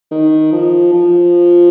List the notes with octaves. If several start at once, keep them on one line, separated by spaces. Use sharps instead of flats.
D#3
F3
F3